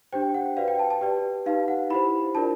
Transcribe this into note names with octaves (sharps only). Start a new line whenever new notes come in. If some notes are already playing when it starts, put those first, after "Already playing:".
D4 G4 C5 G5
F#5
F#4 B4 D5 F5
G5
A5
A5
G4 B4 D5
D#4 G4 B4 F5
F#5
E4 G4 C5 B5
D4 F4 A#4 D5 A5